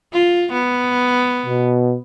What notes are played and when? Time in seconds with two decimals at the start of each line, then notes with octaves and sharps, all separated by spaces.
0.13 F4
0.52 B3
1.46 B2